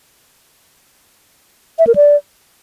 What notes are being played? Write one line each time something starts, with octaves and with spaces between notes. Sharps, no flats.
E5
A#4
D5